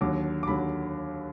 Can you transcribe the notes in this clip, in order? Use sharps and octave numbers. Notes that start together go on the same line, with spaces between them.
D#2 D3 F#3 D6
D6
D#2 D3 F#3 B5